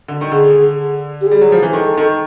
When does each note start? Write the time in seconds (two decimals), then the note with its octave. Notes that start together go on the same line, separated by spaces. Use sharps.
0.08 D3
0.21 D#3
0.32 D3 G#4
1.21 G4
1.27 G3 G#4
1.41 F#3
1.52 F3
1.62 E3
1.73 D#3 A4
1.98 D#3